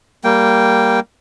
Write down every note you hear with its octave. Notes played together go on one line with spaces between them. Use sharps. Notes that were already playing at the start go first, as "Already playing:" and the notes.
G3 A#3 G5